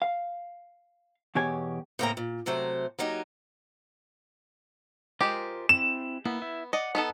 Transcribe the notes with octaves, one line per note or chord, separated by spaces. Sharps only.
F5
E2 B2 G4 C#5 G#5
A2 C#3 A#3 C4 G5 A#5
A#2
C3 F#3 A3 C5
F#3 A#3 D#4 G4
G#3 F4 G4 A#4 C5
C4 E4 E7
A#3 B3 E4
E4 E5
D5 D#5 F#5
B3 D#4 A4